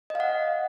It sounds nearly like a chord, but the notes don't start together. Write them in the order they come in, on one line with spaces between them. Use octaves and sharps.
D#5 F5 F#5